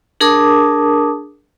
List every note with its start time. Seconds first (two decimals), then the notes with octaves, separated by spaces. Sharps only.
0.21 D4 G#4 A#4 A5 D6 D#6